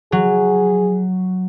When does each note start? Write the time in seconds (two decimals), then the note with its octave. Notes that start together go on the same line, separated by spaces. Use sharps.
0.12 F#3 G#4